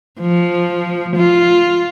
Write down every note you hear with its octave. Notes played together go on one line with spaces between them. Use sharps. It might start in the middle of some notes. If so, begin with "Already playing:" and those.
F3
F4